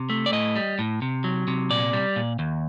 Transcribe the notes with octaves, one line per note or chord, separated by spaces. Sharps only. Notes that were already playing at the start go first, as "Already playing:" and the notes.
Already playing: C3
A3
D5
A2 D#5
G3
A2
C3
F#3
C3
A#2 D5
G3
A#2
D#2